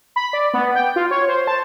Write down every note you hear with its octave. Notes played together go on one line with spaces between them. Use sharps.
B5
D5
B3
G5
F4
C#5
C5
A5